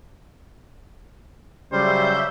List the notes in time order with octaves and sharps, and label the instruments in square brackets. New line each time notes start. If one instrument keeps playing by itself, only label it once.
[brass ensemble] C#3 F#3 [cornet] G3 [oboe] C5 [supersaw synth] E5 G6